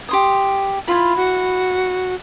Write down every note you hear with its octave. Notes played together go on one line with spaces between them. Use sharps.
G4 C6 D#6
E4 F4 B5
F#4